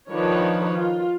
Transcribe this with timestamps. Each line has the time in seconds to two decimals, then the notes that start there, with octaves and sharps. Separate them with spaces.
0.11 D#3 F3 D4 B4 C#5
0.73 F4